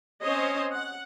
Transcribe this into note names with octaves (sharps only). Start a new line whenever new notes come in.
C4 C#4 C5 C#5 D#5
F#5